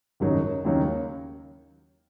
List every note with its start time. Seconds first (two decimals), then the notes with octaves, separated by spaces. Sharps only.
0.20 G#1 F#2 C#3 F#3 D#4
0.65 D#2 C#3 F#3 A#3 D#4